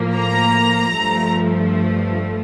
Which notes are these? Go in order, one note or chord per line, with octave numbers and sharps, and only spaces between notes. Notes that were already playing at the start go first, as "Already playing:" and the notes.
Already playing: A2 F3 A#3
A#5
G2 F3 A3